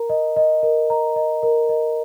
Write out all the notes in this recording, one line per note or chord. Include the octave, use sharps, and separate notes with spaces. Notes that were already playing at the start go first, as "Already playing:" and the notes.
Already playing: A#4 A#5
D#5
D#5
A#4
A#5
D#5
A#4
D#5